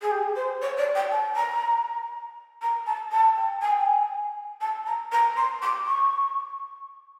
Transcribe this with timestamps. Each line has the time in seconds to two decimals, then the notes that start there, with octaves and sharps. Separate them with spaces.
0.01 G#4
0.11 G4
0.36 C5
0.61 C#5
0.77 D5
0.95 G5
1.11 A5
1.36 A#5
2.61 A#5
2.86 A5
3.11 A5
3.36 G5
3.61 G#5
3.71 G5
3.81 G#5
4.61 A5
4.86 A#5
5.12 A#5
5.36 C6
5.62 D6
5.86 C#6